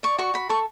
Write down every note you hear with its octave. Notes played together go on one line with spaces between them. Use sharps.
D5 C#6
F#4 C#6
F#4 B5
A4 C#6